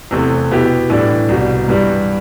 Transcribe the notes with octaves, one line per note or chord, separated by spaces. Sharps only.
E2 C3 E3 A3
B2 B3 E4 G4
A2 E3 G3 D4
C2 B2 G3
G2 E3 G3